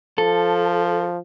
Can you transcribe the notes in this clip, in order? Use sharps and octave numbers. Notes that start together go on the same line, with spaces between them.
F3 A4